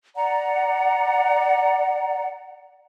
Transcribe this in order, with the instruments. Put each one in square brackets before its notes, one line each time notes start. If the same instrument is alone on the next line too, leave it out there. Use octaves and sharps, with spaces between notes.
[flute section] D5 F#5 A#5